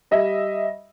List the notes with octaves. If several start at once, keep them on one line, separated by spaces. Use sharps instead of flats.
G3 D#5 E5